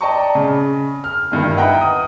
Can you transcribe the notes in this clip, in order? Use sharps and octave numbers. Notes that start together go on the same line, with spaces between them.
D5 D#5 G5 A5 A#5 C#6
C#3
F6
G1 G2 D#3
B4 D#5 E5 F#5 G5 A#5
D#6